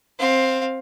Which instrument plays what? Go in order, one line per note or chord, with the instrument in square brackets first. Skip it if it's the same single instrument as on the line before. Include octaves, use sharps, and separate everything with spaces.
[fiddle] C4 F5